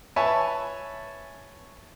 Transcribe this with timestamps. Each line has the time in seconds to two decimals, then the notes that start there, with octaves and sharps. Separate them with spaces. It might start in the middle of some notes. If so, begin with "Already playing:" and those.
0.16 B4 C#5 E5 G#5 A5